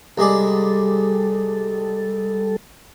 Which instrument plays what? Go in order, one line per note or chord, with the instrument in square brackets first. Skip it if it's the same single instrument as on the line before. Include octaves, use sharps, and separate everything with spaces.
[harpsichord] C2 G#3 D5 [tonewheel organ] G3 A4